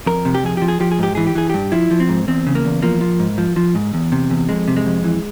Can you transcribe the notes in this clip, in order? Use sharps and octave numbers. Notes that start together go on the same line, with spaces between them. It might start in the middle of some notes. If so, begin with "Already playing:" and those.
F2 A#4
C3
G4
F2 G#4
F3 G4
G#4
F3 G4
G#4
G#2 G4
E3 G#4
G4
E3 G#4
G2 G4
F3 E4
F3
C4
G#2
E2 C4
C#3
A#3
E2
F3 A#3
F3
G#2
F3
F3
G#2
E2
C3
E2
F2 G#3
C3
G#3
F2
E3